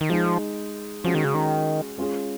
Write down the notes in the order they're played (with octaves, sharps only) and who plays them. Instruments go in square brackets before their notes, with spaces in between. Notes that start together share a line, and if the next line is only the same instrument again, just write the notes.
[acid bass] D#3
[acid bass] F3 [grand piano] G#3 D#4 G#4
[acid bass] F3 [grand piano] G#3 C#4 F#4
[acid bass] D#3
C#3
D#3
[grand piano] G#3 C#4 F4 G#4